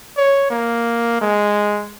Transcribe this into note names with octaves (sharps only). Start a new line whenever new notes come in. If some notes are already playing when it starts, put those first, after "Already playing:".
C#5
A#3
G#3